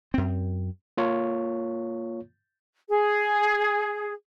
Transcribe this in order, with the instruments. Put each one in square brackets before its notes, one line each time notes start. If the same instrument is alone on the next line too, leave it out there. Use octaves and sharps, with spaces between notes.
[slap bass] F#2 C4
[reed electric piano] A#3 F4 C#5
[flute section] G#4